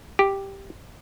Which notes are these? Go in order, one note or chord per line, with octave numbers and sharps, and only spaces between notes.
G4